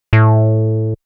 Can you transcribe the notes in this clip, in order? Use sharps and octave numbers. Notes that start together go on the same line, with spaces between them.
A2